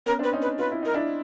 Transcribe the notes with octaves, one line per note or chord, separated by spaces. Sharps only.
B3 C#4 A#4
C4 D4
B4
C#4 D#4
B4
F4 B4
E4
D#4 A#4
D4 E4